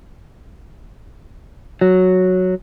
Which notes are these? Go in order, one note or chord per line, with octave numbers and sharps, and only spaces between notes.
F#3